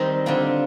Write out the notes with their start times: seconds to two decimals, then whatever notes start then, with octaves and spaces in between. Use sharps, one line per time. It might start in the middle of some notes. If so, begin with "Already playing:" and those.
Already playing: D#3 G3 C4 D#4
0.26 D3 G3 C4 F4